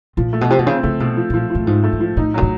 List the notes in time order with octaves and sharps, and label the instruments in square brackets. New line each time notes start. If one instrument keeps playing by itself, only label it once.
[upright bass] A#2 [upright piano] F3
[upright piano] A3
[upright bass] B2
[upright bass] C3 [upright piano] F3
[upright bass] B2
[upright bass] C#3 [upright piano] C4
[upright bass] C#3 [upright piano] A3
[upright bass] B2 [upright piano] A3
[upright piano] F3
[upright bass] A#2 [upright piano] F3
[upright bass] A2 [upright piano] F3
[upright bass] G#2 [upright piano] F3
[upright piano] A3
[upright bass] G#2
[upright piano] F3
[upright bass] A2 [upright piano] D#4
[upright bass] A#2 [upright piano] F#3
[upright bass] A2